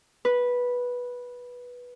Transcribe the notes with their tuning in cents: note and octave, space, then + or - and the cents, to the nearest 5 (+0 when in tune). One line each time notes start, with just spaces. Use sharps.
B4 -10